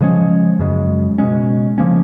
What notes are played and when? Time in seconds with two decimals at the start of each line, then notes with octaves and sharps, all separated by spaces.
0.01 C#3 F3 G#3 C#4
0.59 F#2 C#3 G#3
1.18 B2 G#3 C#4
1.78 C#3 F3 A#3 C#4